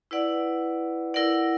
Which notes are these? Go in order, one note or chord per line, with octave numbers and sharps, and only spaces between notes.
E4 B4 D5 F#5
E4 A#4 D5 F#5